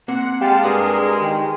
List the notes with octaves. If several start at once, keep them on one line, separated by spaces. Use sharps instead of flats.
A#3 C4 F#5
G#3 G4 F5 A5
G2 G#4 A#4 D5 F#5
D#3 G4